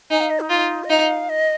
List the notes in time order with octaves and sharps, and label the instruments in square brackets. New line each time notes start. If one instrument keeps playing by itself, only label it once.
[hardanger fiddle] D#4 [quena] G#5
[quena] F5
D#5
D#4
[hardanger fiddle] F4
[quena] D#5
[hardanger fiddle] D#4 [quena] F5
[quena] D#5